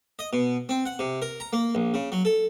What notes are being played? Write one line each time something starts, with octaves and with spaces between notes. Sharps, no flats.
D#5
B2
C4
F#5
C3
A#4
A#5
A#3
A#1
C#3
F#3
A4